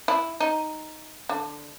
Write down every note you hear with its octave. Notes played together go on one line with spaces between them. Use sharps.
E4
D#4
D3